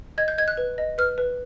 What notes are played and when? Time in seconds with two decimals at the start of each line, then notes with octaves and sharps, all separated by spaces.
0.18 D#5 G#6
0.28 G6
0.38 D#5 G#6
0.48 F#6
0.57 B4
0.78 D#5
0.98 B4 F6
1.18 B4